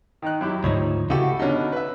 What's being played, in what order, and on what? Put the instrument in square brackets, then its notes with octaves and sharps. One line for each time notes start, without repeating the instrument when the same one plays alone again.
[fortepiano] D#3 D#4 F#6
F#2 E4 G4
[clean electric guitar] D2 G#2 F3 [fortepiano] D#4 C#5
[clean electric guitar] C#3 F#4 [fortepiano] E4 G4 A4
[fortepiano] B2 D3 [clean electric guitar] C#4 D#4
[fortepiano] B4 E5